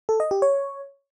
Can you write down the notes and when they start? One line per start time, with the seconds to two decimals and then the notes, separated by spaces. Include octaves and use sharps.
0.09 A4
0.20 D#5
0.31 G4
0.42 C#5